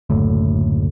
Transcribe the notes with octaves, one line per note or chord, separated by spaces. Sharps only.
F#1 D2 A2